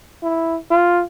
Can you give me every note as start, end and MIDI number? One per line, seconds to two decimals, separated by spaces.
0.23 0.58 64
0.71 1.03 65